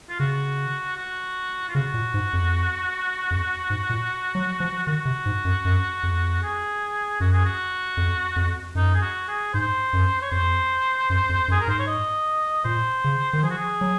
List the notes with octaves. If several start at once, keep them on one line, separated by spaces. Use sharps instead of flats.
F4
C#3 F#4
F#4
F4
C#3 F#4
A#2
G#2
F2
F2
G#2
A#2
F#3
F3
D#3 F#4
C3
G#2
F#2
F#2
F2
G#4
F#2 F#4
G#4
F#4
F2
F2
F#2 D#4
G#4
F#4
G#4
G#2 C5
F#2
C#5
F2 C5
F#2
F2
F#2
G#4
A#4
G#2 C5
C#5
D#5
A#2 C5
C#3
D#3
F3 G#4
F#4
G#4
F#3